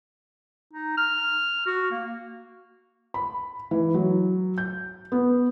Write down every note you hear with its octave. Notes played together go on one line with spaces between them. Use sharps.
D#4
F6
F#4
A#3
B5
E3
F#3
G6
B3